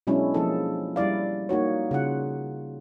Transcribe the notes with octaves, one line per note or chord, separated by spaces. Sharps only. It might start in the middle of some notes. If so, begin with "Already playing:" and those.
B2 F#3 G#3 C#4 D4 E4
F3 A#3 E4 G#4 A4
G3 E4 D5 F5
A#3 D#4 F#4 C#5
C#3 F4 F#5